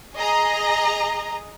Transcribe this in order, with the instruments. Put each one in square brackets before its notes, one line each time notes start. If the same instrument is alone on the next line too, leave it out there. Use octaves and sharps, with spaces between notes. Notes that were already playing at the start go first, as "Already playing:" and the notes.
[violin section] G#4 D#5 A#5